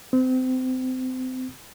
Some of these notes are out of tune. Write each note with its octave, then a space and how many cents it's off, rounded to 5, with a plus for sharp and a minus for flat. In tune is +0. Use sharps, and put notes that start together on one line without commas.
C4 -30